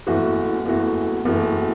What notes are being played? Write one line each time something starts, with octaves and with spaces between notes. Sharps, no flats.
F#1 E2 E3 A3 F#4
F#1 E2 E3 A3 F#4
F#1 E2 E3 A3 F#4